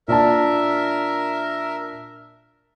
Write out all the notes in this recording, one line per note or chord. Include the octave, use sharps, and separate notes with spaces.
A#2 D4 A#4 E5 A5